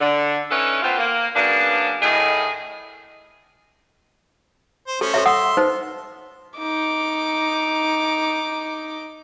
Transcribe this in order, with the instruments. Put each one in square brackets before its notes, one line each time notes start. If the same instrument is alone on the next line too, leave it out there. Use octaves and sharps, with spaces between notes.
[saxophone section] D3
C#4 D#4 E4 A4 B4 C#5
A3 B3 C4 F4
A#3
C#3 F#3 A#3 B3 D4
A2 D#3 G#4
[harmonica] C5
[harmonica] A3 C#4 C5 [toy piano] A4
[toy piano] A4 C#5 E5
[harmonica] E5 C6 [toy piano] F#5 D#6
[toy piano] D#4 B4 C5
[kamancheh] D#4 D6